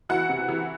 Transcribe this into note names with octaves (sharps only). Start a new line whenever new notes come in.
E3 F#4 F#5
C3
E3